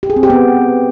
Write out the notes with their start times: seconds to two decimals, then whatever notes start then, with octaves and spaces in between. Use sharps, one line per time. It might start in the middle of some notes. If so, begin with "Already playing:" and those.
0.03 G4
0.10 G#4
0.16 C4
0.23 G4
0.30 B3